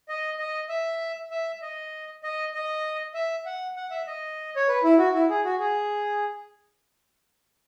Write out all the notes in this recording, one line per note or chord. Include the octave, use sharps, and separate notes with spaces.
D#5
D#5
E5
E5
D#5
D#5
D#5
E5
F#5
F#5
E5
D#5
C#5
B4
E4
F#4
E4
G#4
F#4
G#4